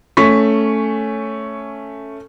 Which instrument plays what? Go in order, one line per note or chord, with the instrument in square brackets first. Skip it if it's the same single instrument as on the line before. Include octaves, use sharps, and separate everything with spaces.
[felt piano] A3 C#4 C#6 B6